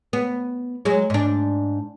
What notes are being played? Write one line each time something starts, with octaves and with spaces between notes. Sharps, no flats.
B3
F#3 G#3
G#2 D4